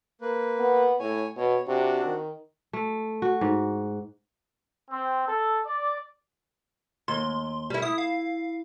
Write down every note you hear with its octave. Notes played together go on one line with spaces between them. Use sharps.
A#3 B4
B3
A2 C#5 G#5
B2 C#5
C3 C4 D4 F#4
D#3
A3
F#4
G#2
C4
A4
D5
D#2 C6
G3 E4
E4 D#6
F5